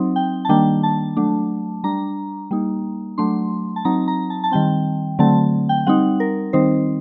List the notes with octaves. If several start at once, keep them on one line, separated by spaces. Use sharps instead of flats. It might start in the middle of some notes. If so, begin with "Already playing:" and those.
Already playing: F#3 C4 D#4
G5
A5
D#3 G3 A#3 D4 G5
A5
F#3 A3 D4
G3 D4 A#5
G3 A#3 D#4
F#3 A3 D4 C6
A5
F#3 C4 D#4 A#5
A#5
A5
A5
D#3 G3 C4 G5
D3 F#3 A3 C4 A5
G5
G3 C4 D#4 F#5
A#4
D#3 G3 C4 D#4 C5